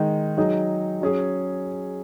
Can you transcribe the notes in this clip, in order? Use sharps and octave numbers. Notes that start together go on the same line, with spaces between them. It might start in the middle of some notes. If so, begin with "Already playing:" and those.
Already playing: D#3 G#3 D#4
F#3 D#4 G#4
F#3 C#4 G#4